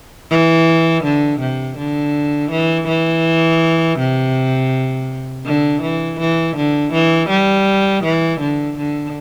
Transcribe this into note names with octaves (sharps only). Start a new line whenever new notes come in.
E3
D3
C3
D3
E3
E3
C3
D3
E3
E3
D3
E3
G3
E3
D3
D3